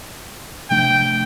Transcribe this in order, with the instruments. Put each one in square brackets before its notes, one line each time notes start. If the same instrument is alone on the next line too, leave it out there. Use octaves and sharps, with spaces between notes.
[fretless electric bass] C3 F3 A3 D4 [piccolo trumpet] G5